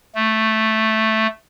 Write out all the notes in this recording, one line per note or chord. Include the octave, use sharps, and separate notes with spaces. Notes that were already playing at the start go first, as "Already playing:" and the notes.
A3